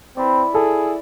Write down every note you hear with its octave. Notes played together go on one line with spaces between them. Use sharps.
C4 E4 B4 D5
E4 G#4 A4